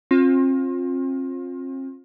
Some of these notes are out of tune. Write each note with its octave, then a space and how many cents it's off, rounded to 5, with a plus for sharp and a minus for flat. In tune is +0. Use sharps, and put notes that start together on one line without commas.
C4 +35 F4 +20